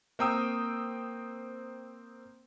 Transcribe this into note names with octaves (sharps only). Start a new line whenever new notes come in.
A#3 C4 G5 A#5 D#6 E6